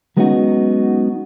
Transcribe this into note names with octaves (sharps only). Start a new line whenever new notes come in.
F#3 G#3 B3 C#4 D#4 F#4